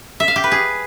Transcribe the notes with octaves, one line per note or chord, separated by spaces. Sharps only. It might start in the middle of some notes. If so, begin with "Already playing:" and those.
E5
F5
G4
B4
G#4